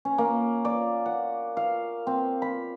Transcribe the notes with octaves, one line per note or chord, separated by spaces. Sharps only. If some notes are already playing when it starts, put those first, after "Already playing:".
C#4
A#3
D5
F#5
F5
C4
B5